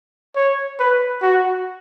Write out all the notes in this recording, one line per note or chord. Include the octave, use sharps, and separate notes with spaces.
C#5
B4
F#4